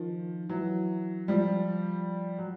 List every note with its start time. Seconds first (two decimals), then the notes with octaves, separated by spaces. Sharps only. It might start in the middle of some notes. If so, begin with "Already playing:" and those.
Already playing: D#3 F3
0.49 E3 F#3
1.28 F3 G3
2.39 F#3